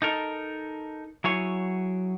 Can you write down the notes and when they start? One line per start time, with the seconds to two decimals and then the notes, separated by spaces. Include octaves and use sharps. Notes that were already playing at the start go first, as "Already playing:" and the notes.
0.02 D#4 A4 A#4
1.24 F#3 E4 G#4 C#5